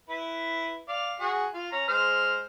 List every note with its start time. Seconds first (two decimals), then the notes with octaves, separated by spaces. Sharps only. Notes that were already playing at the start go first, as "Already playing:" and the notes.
0.09 E4 B4
0.89 D5 F5
1.20 F#4 G#4
1.54 F4
1.72 C#4 A#5
1.88 G#3 C5 F6